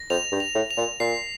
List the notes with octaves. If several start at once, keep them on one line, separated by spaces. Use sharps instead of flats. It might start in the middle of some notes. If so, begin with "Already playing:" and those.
Already playing: A#6
F2 F7
G2
F7
A2
F7
A#2
A#2 C7